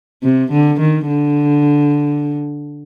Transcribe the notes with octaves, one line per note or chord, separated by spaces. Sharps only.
C3
D3
D#3
D3